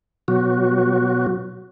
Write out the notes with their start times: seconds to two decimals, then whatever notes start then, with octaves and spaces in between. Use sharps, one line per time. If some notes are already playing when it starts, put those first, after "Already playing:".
0.28 B2 F#3 F#4